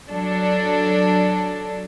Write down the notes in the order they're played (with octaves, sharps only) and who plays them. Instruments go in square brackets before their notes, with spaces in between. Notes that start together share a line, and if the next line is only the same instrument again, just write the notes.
[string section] F#3 D4 A4